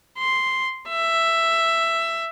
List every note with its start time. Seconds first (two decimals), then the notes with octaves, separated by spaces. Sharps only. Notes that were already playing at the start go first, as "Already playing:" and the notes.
0.18 C6
0.88 E5